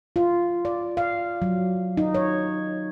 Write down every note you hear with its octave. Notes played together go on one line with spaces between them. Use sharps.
F4
D5
F5
F#3
D#4
C#5